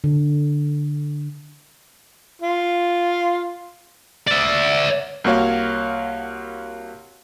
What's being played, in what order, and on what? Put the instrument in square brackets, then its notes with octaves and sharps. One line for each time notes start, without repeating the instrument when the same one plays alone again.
[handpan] D3
[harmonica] F4
[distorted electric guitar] D5 E5
[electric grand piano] C2 A#3 F#4 C#5 F5